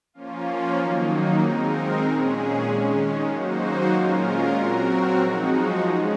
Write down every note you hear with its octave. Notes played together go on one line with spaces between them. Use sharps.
F3 A#3 C#4 F4
D#3 F#3 A#3 D#4
G#3 C4 D#4 A#4
A#2 G#3 C#4 G#4
D#3 G#3 C#4
F#3 A#3 D#4 F#4 C5
A#2 G#3 C#4 F4 A#4
F#3 C4 F#4 A#4
F3 G#3 D#4 F#4
G#3 C#4 G#4